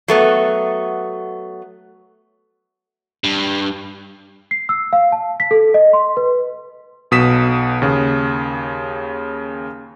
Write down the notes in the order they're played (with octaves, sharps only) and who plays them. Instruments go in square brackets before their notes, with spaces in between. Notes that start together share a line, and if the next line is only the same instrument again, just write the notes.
[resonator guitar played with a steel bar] F#3 A3 B3
[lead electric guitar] G2
[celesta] C7
E6
F5
A5
B6
A4
D#5
C6
B4
[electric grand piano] B1 B2 D#6 B6 E7
D#2 C#3